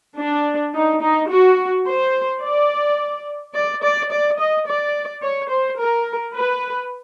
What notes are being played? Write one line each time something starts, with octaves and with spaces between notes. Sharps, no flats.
D4
D#4
D#4
F#4
C5
D5
D5
D5
D5
D#5
D5
C#5
C5
A#4
B4